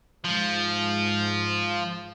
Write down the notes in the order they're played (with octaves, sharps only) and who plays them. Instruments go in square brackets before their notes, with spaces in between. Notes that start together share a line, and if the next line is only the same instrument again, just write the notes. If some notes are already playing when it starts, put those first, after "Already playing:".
[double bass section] G#2 [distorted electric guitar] F3